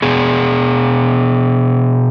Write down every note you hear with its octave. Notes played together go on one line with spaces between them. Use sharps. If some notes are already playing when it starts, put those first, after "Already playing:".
B2 B3 G#4